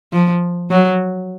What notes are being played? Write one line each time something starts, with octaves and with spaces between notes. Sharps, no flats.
F3
F#3